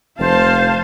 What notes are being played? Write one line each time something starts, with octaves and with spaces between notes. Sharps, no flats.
F1 C5 F5 A5